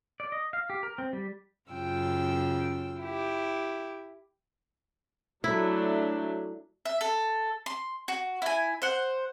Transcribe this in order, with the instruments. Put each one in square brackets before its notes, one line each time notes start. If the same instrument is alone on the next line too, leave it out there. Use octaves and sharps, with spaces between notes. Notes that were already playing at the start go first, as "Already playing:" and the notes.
[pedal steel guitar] D5
D#5
F5
G4
A#4
C4
G3
[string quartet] F#2 C#3 F4 G5 E6
E4 G4
[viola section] F#3 A3 D4 [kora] E4
[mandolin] E5
A4
C6
F#4
E4 G#5
C5 F#5